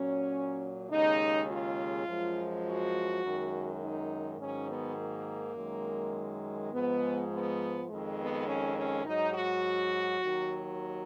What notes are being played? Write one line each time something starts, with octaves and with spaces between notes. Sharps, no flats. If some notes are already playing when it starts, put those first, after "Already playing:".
Already playing: A#2 F#3 C#4
D#2 C#3 G#3 D#4
F4
F#2 F3 G#3
F#4
F#2 D#3 G#3
D#4
G#2 D#3 F#3 C#4
B3
A#3
F#2 D#3 G#3
G#2 F3 G#3 B3
B3
F2 D#3 G#3
B3
C#4
C#4
G#2 F#3 D#4
F#4
D#2 D#3 F#3